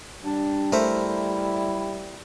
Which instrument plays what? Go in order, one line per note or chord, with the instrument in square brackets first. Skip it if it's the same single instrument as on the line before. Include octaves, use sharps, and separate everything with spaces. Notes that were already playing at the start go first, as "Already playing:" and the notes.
[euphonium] G3 [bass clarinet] D4
[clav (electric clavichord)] A3 [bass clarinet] E4 [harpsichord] A#4 C5 E5